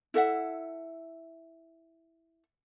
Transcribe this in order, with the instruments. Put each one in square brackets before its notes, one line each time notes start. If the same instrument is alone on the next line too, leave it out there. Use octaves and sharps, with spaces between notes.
[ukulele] E4 A4 E5 F#5